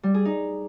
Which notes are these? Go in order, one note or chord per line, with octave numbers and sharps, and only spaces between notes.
G3
G#4
D#4